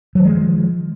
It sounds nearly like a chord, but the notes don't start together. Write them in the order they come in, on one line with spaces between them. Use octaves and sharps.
F#3 D#3 G#3 F3